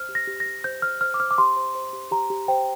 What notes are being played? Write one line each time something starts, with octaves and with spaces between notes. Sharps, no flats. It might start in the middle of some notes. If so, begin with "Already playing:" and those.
Already playing: C5 F6
G4
A#6
G4
A#6
G4
C5 G6
C5 F6
C5 F6
D6
C5 F6
D6
G4 C6
C5
C5
G4
G4 A#5
G4
C5 G5